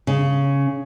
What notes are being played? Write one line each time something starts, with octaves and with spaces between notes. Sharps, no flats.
C#3